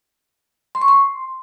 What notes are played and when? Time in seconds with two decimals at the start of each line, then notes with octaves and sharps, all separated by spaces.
0.75 C6
0.82 C#6
0.88 C6